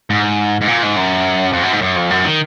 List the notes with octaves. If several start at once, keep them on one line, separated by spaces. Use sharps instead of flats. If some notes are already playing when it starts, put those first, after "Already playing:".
G#2
G#2
A#2
G#2
F#2
F2
F#2
G#2
F#2
F2
F#2
D#3